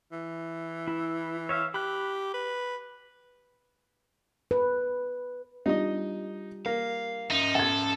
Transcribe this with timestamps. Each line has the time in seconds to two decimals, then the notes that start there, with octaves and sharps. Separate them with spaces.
0.12 E3
0.88 E4
1.49 C#5 E5 F5
1.74 G4 B5 F#6
2.34 B4
4.51 B4
5.66 G3 D4 D#4 F4 D#5
6.66 A#3 F5
7.31 C#4 D#4 E5
7.55 A4 F#5 G#6